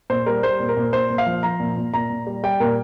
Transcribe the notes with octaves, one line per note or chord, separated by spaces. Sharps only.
A#2 C5
G3 A#4
G3 C5
A#2
A#4
A#2
A#2 C5
A#2
F5
F3
F3 A#5
A#2
A#2
A#2 A#5
A#2
G3
G3 G5
A#2 A#4